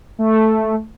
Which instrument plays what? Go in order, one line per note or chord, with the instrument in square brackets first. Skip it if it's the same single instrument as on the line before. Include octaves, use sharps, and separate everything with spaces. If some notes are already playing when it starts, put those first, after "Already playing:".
[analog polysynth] A3